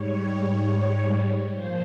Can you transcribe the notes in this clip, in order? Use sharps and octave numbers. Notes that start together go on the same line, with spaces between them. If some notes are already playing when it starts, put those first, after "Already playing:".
Already playing: G#2 G3 C#5
A#2 F3 C5